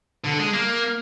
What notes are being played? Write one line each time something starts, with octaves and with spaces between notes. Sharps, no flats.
D3
G#3
A#3